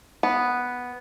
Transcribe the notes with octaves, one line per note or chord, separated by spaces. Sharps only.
B3